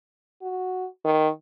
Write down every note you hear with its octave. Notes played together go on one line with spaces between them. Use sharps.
F#4
D#3